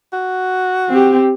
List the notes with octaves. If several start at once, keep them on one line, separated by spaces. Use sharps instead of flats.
F#4
C4 G4